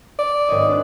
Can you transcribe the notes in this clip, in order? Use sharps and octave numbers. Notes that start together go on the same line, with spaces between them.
D5
G#1 C#5 D#5
D4 F#6